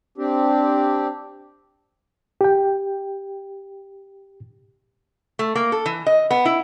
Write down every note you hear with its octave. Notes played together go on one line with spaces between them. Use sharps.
C4 D4 G4
G4 G5
A3
A#3
A4
E3
D#5
B3
E4